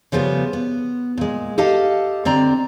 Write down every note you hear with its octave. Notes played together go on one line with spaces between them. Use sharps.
C#3 F3 G3 A3 B3
B3
A#2 G#3
G4 A4 D#5 F5 A5
D3 C4 D5 A#5